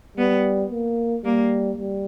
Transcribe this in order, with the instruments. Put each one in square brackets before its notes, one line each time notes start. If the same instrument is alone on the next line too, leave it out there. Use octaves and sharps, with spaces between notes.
[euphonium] G3 [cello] B3
[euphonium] A#3
[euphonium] G3 [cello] A#3
[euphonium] G3